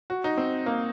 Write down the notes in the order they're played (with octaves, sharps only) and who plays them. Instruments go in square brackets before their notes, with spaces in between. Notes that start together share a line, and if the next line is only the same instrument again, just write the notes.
[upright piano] F#4
D#4
C4
A#3